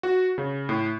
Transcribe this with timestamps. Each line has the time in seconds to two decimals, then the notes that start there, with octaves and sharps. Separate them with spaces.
0.03 F#4
0.38 C#3
0.69 A2